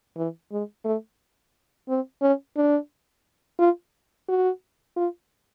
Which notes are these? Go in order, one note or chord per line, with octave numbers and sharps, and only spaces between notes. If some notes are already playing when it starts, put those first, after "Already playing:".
E3
G#3
A3
C4
C#4
D4
F4
F#4
F4